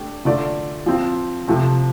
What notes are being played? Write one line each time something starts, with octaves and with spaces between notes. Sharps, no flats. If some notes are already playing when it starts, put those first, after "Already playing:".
Already playing: A3 D4 G4
D3 A3 F4 D5
F3 C4 F4
C3 F3 A3 C4